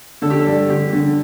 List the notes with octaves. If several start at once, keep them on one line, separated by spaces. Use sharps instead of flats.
D3 A4
G4
A4
G2
D3 G4
D3